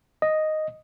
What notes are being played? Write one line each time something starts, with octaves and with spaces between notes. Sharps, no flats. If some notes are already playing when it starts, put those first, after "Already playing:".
D#5